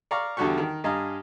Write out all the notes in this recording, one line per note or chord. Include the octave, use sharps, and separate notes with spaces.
D5 F5 A#5 C#6
E2 D3 G3 F#4 G4 C#6
D#3
G2 D#5 F5 G#5 A#5